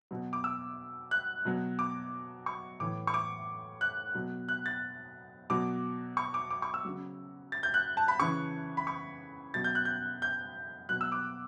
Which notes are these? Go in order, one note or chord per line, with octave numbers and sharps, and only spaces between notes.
B2 F#3
D6
E6
F#6
B2 F#3
D6
C#6
A2 E3 D6
C#6
D6
F#6
B2 F#3
F#6
A6
B2 F#3 D6
C#6
D6
D6
C#6
E6
C#3 F#3
A6
G6
F#6
A5
B5
C#3 E3 C#6
B5
C#6
B2 F#3 A6
G6
F#6
G6
G6
B2 F#3 F#6
E6
D6